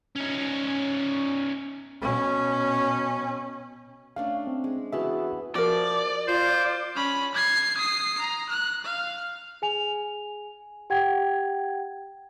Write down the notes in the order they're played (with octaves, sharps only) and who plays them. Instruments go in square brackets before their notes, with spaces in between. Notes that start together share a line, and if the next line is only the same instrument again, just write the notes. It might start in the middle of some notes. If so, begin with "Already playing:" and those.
[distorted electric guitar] C#4 D#4
[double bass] B2 C#4
[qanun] A3 C#4 D4 [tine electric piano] F5
[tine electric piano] C4
[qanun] G#3
[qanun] E3 B3 A5 [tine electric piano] F#4 G#4 E5
[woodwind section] F3 [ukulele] F#4 A#4 [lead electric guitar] D5
[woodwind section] F4 [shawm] C5
[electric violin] C#4 B5
G#6 C7
D#6 C7
A#5
F#6
F5
[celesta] G#4 G#5 F7
G4 F#5 G5 G#6